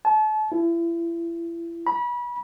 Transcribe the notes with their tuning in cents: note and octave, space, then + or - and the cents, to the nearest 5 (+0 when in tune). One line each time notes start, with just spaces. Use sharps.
A5 -35
E4 +35
B5 -30